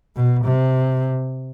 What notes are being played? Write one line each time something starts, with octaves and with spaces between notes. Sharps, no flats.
B2
C3